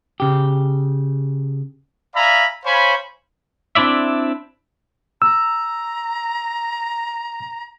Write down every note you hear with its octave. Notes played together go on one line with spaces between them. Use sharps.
C#3 G4
D5 E5 F5 G#5 A#5 B5
C5 C#5 F5 G#5 B5
C4 D4 E4 D5 E5
A#5 E6